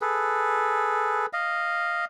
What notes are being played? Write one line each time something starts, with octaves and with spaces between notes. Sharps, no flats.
G#4 A4 B4
D#5 F5